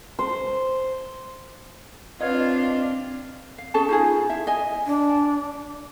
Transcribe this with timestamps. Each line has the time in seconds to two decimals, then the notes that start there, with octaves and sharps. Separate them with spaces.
0.19 C5
2.20 C4 D4 F4 B4 C#5 D#5
3.58 F5
3.74 C#4 G#4 A4 A5
3.89 D#4 F4 G#4
4.29 E4 E5
4.47 D#5 G#5
4.86 D4